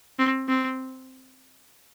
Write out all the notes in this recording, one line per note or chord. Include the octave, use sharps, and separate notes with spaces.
C4
C4